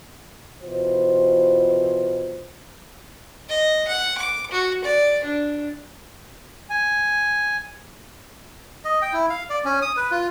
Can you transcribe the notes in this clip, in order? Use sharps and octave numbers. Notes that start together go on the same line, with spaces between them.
B2 E3 F4 C5
D#5
F#5
D6
F#4
D5
D4
G#5
D#5
G5
E4
F5
D5
C#4
D#6
B4
F4